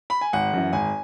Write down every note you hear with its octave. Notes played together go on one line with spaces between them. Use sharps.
B5
G#5
G#1 F#5
F#2 E3
G#1 G#5